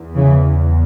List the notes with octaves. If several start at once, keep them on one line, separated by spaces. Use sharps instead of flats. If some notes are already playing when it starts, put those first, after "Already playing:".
Already playing: E2
C#3 E3